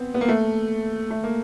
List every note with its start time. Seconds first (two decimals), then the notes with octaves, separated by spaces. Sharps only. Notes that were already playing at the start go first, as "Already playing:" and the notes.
Already playing: B3 C4
0.14 B3
0.21 A#3
0.28 A3
1.10 A3
1.24 A#3